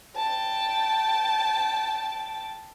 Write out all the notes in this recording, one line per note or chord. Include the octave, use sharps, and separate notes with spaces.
G5 A5